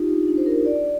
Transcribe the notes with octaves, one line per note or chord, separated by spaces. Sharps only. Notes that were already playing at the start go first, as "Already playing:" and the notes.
Already playing: D#4 F4 G4
D4
D4
C5
A#4
D5